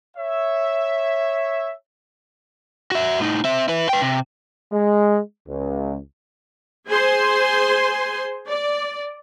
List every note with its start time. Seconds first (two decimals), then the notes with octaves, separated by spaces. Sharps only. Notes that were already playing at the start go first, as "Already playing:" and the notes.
0.17 C#5 E5
2.92 F#4 E5
3.20 A2 D#4
3.44 C4 E5
3.68 E4 B4
3.89 B4 G5
4.02 C3
4.72 G#3
5.47 C#2
6.87 G#4 C5 G#5 C6
8.48 D5